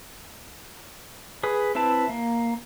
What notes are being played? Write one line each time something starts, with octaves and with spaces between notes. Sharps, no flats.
G#4 B4
C4 E4 B4 A5
A#3